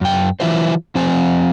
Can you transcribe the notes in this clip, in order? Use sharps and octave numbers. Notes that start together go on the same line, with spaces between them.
F#2 G5
E3 F#3 E4 F4 C5
F3 C4 C5 G#5